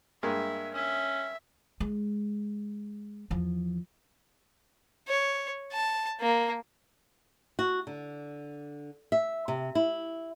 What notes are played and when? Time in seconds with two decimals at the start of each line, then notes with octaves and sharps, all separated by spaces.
0.23 G2 G#3 A#3 E5
0.73 C#4 E5
1.80 G#3
3.30 E2 F3
5.08 C#5
5.72 A5
6.20 A#3
7.59 F#4
7.87 D3
9.12 E5
9.48 C3
9.75 E4